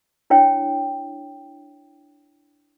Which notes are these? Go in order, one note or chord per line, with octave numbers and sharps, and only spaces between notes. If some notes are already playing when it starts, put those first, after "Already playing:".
D4 E4 C#5 G5